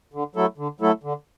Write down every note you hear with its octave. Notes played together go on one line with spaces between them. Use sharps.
D3
F#3 A3 E4 A4
D3
F#3 A3 E4 A4
D3